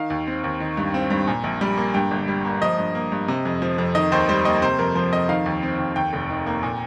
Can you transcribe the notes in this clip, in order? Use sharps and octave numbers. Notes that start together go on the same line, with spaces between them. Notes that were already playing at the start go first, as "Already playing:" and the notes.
Already playing: D#3 F5
D#2
C4
D#2
D#3
G2
C4
G2
A#2
A#1
G3
A#3
G2 G5
G1
G3
A#3
F3 D#5
G2
A#3
G2
C3
F2
F3
F2
D#3 D#5
D#2 C5
G3 C5
A#3 D#5
C3 C5
F2 A#4
F3 C5
F2 D#5
D#3 F5
D#2
C4
D#2
D#2 G5
F1
D#3
A#3
A#2